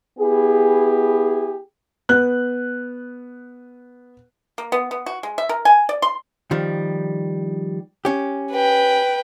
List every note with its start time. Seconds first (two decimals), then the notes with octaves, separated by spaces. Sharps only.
0.19 B3 E4 G4 G#4
2.09 B3 F#6
4.58 A#3
4.72 B3
4.91 B3
5.06 F#4
5.23 G#3
5.38 E5
5.49 A#4
5.65 G#5
5.89 D5
6.02 C6
6.51 D#3 F3 G3
8.05 C#4 G4
8.52 B4 G5